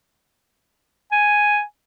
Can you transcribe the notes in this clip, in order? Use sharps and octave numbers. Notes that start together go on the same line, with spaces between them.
G#5